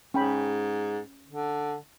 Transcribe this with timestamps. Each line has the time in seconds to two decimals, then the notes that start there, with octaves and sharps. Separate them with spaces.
0.14 G#2 C#4 G5 B5
1.28 D3